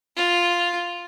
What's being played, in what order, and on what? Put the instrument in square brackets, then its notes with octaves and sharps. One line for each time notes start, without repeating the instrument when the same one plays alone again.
[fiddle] F4